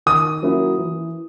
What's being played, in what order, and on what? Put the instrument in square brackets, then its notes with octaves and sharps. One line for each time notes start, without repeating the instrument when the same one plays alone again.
[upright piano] D#3 [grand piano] D#6
[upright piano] F#3 A#3 C#4 E4
E3